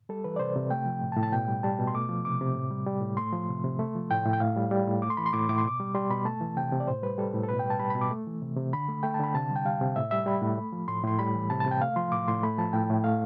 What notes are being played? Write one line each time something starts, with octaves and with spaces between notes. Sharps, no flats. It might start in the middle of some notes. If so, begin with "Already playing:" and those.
G3 A4
E3 B4
D5
C3 C5
C3
A3 G5
F3
A2
A5
A2
A5
B2 G5
G3
G3 A5
B2
C6
A3 D6
F3
C3 D6
C3
A2
G3
G3
A2
A3 C6
F3
C3
C3
A3
F3
A2 G5
A2
G5
A2 F5
G3
G3
A2
A3 D6
C6
E3 B5
C6
A2 D6
A2 D6
C6
B2 D6
G3
G3 C6
B2 B5
A3 A5
E3
C3 G5
C3
D5
A2 C5
G3 B4
G3 A4
A2
A4
B2 B4
G5
G3
A5
G3 B5
B2 B5
D6
A3
E3
C3
C3
D3 B5
A3
A3 G5
A5
D3 B5
C3 A5
G3
G5
G3 F5
C3
A2 E5
G3 E5
G3 B5
A2
A3
F3
A2 C6
A2 C6
G3 B5
E3
C3 A5
A5
C3
G5
A3 F5
F3 C6
A2 D6
A2 C6
A3 B5
F3 A5
A2 G5
A2
A3 F5